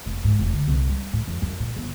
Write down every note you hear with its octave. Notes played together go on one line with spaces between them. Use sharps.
F1
G#2
F1
D3
C2
G3
A2
F2
F#2
A#2
G1